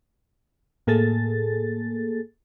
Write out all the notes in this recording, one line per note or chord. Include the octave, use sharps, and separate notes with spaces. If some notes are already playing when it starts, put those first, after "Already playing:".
A2 A#3 G#4 A4 A6